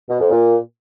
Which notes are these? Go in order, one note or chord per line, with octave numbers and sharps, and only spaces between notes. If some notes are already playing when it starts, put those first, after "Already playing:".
B2
F2
A#2